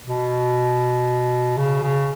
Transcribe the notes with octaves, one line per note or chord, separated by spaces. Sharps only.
B2
C#3
C#3